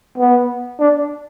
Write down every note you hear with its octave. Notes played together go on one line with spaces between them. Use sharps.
B3
D4